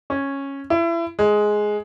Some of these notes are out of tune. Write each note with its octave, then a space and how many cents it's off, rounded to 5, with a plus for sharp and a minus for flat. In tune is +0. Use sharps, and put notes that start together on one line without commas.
C#4 -10
E4 +30
G#3 +10